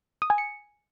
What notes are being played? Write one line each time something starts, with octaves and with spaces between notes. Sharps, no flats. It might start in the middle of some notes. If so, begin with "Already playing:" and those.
D#6
G#5
C#7